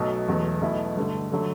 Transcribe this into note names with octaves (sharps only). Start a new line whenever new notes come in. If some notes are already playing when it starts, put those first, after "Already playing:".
Already playing: B1 B2 F#3 A3
E1 E2 B2 F#3 A3
B1 B2 A3 E4
G2 D3 A3
D3 F#3 A3